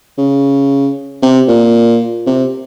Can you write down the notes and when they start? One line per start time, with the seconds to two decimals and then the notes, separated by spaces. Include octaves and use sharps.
0.18 C#3
1.23 C3
1.48 A#2
2.27 C3